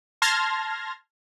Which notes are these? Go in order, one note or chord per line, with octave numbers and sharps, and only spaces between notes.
A5 C6 F6 G#6 A#6